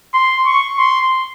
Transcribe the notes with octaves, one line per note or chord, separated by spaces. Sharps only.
C6
C#6
C6